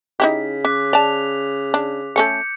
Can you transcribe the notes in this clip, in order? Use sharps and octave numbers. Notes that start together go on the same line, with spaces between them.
C#3 D#4 E4 G4 B6
C#4 D6 F#6 B6
D5 A5 F7
D4
A3 C#4 A4 G6 C#7